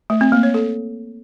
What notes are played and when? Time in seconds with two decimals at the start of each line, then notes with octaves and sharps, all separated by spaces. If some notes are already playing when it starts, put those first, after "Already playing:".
0.10 A3
0.21 C4
0.32 A#3
0.43 C#5
0.54 A4